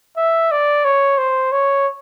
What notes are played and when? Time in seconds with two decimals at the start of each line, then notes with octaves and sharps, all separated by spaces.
0.17 E5
0.51 D5
0.85 C#5
1.18 C5
1.52 C#5